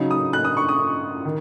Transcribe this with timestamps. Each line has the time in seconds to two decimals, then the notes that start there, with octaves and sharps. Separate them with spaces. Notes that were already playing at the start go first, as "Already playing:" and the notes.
Already playing: C#3 F#3 D#4
0.11 D#6
0.33 F#6
0.45 D#6
0.57 C#6
0.69 D#6
1.25 D#3